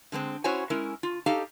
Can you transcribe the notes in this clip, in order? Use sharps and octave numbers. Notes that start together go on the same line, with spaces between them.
D3 G#3 B3 C4
C#4 E4 F#4 C5 C#5 G#5
G#3 C#4 E4 A#4
F4
D#4 G4 A4 D#5 F5